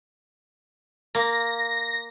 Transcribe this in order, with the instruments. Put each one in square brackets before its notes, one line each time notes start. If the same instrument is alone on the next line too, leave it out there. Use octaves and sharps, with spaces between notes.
[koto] A#3 [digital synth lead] A#6